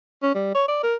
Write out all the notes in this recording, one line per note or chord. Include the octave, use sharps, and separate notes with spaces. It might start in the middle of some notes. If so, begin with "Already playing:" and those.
C#4
G3
C#5
D5
A#4